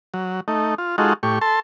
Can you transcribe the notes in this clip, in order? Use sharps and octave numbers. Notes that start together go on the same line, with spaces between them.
F#3
A3 D#4
F4
G#3 D#4 F4 F#4 A4
A2 G4 C#6
A4 A5 C6